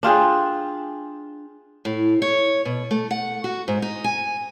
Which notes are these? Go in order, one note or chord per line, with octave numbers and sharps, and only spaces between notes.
D4 F4 G4 G#4
A2
C#5
B2
A3
F#5
F#4
G#2
D#4
G#5